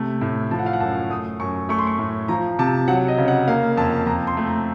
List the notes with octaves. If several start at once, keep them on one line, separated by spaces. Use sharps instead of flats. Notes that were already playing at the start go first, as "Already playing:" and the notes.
Already playing: C3 A3
A2
F3 A5
F#5
F5
F#5
F#2 A5
A3 D#6
F#2 C#6
A3 C#6
C6
C#6
A2
F3 A#5
C3 A5
F#3 F#5
D#5
C#3
F#5
A#3 F5
F2 A5
F2 A#5
C6
A3
A#5